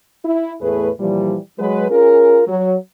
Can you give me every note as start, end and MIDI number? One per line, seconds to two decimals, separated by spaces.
0.24 0.53 64
0.61 0.89 40
0.61 0.89 45
0.61 0.89 57
0.61 0.89 68
0.61 0.89 71
1.00 1.36 46
1.00 1.36 52
1.00 1.36 53
1.00 1.36 55
1.59 1.86 54
1.59 1.86 56
1.59 1.86 71
1.90 2.42 61
1.90 2.42 65
1.90 2.42 68
1.90 2.42 70
2.48 2.74 54